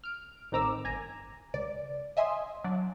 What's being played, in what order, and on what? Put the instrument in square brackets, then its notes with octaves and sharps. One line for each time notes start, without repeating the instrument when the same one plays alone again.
[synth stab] F6 D7
A1 D#3 C4 A#5 D6 E6
G1 G#5 A#5
C#2 D5
D#5 E5 G#5 C6 D#6
F#3 D4